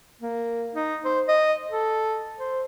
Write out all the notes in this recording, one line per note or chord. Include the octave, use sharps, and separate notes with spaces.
A#3
D#4
C5
D#5
A4
C5